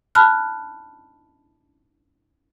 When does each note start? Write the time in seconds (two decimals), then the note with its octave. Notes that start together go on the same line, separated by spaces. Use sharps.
0.15 A5 B5 F6 F#6